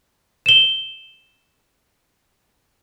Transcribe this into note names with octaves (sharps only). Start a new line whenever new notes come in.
E7 G7